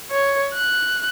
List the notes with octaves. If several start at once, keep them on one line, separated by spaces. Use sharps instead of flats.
C#5
F#6